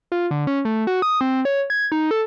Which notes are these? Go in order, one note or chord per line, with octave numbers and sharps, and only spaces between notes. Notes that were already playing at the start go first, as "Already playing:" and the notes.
F4
D3
C#4
A3
F#4
D#6
C4
C#5
G#6
D#4
A4